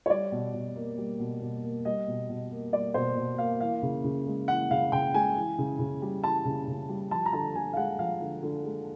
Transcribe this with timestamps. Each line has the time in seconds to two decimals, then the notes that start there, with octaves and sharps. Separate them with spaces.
0.06 C#5
0.10 G3 D5
0.32 B2
0.53 B2
0.76 A#3
0.98 G3
1.19 B2
1.41 B2
1.63 A#3
1.85 G3 D#5
2.08 B2
2.29 B2
2.51 A#3
2.73 G3 D5
2.94 B2 C5
3.16 B2
3.38 A#3 F5
3.61 E3 F5
3.83 C#3
4.04 C#3
4.26 G#3
4.48 E3 F#5
4.71 C#3 F5
4.92 C#3 G5
5.14 G#3 G#5
5.36 E3
5.58 C#3
5.79 C#3
6.02 G3
6.23 E3 A5
6.45 C#3
6.68 C#3
6.89 G3
7.11 F3 A5
7.26 A#5
7.33 D3 A5
7.55 D3 G#5
7.73 F5
7.77 G#3 F#5
7.99 F3 F5
8.21 D3
8.43 D3
8.64 G#3